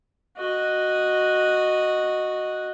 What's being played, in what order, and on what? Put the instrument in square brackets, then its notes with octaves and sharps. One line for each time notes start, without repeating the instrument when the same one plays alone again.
[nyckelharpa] F#4 D#5